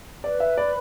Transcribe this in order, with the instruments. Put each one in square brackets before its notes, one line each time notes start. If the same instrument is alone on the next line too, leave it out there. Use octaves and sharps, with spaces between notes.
[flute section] B4 [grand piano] D5
[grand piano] E5
[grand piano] D5 [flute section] B5